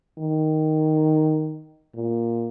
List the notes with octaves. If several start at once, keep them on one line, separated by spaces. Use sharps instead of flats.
D#3
A#2